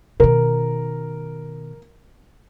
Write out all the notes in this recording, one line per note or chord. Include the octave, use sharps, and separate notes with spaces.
B2 D#3 A#4